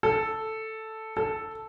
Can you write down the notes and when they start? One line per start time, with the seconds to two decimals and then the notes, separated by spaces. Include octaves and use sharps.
0.03 A4
1.17 A4